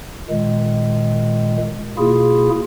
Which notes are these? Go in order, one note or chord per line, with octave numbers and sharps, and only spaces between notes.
A#2 D#3 G#3
B2 A#3 E4 F4 G#4